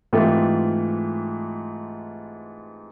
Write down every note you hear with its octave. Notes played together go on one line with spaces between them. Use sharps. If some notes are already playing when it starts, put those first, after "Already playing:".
G#2 E3 A3 C4 F4 G4